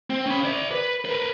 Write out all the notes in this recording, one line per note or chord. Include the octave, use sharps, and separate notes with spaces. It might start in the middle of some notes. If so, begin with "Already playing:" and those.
C4
C#4 B5
C5 D5
B4
A#4 B4